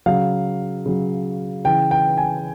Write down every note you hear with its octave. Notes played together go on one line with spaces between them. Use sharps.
C#3 F#3 F5
C#3 F#3
C#3 E3 G5
G5
G#5